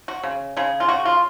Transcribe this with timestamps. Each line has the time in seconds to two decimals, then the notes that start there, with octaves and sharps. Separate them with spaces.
0.08 F#4
0.23 C#3
0.56 C#3 G#4
0.80 F4
0.88 C#3 F#4
1.05 F4